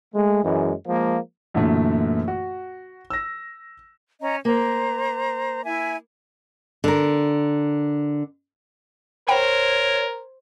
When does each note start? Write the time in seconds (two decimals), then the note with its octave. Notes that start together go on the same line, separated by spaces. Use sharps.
0.14 G#3 A3
0.43 F#2 E3 G#3
0.87 F3 G#3 A#3
1.54 F#2 A#2 D3 E3 A3
2.28 F#4
3.10 E6 A#6
4.21 C#4 D#5 A#5
4.45 A#3 C5 A#5
5.64 E4 E5 G#5
6.84 D3 A#4
9.28 A#4 C5 C#5 F#5 G5 B5